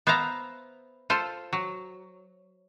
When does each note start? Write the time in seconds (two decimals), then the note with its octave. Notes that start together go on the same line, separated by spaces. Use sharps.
0.07 B3 C5 E5 F5 A#5
1.10 F4 A4 C5
1.53 F#3